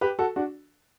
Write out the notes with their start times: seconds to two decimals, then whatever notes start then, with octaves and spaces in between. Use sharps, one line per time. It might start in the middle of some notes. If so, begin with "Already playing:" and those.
0.01 G4 B4
0.19 F#4 A4
0.36 D4 F#4